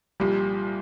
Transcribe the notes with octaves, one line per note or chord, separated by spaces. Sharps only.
C2 A#2 F3 G3